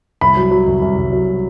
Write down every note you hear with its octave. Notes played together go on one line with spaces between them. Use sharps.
C2 B5
F#3
F#3
C2
C2
C2
F#3